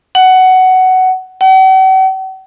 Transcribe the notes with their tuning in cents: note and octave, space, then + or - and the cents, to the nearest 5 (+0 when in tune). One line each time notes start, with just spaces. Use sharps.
F#5 +15
F#5 +45